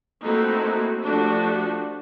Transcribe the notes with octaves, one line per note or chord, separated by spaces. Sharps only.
A3 A#3 C4 D#4 E4 F#4
F3 A3 D4 F#4 G4